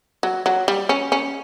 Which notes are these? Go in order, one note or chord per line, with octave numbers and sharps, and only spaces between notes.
F#3
F#3
G3
C#4
C#4